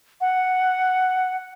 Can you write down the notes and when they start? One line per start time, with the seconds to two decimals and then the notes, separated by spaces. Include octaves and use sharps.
0.21 F#5